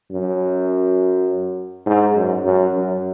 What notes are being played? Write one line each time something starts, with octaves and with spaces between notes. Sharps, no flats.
F#2
G#2
F#2
F#2
F#2